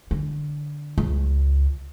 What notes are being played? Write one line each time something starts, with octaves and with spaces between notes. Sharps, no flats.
D3
C#2